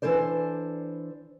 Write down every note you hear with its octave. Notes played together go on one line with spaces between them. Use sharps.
E3 D4 A4 C5 D5